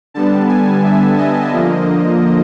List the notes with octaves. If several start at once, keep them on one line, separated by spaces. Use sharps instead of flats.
D3 G3 B3 A5
G#5
E5
D#5
D3 F3 A#3